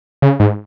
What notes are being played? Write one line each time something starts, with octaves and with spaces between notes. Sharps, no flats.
C#3
G#2